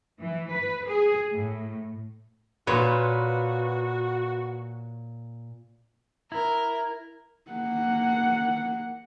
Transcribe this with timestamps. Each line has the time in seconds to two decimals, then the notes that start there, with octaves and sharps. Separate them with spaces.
0.20 E3
0.51 B4
0.87 G#4
1.32 A2
2.67 A#2 F#4 B4 C#5 C6
6.32 E4 A#4
7.51 A#3 F#5